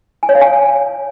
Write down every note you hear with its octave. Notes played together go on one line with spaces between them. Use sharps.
G#5
C#5
F5
G#5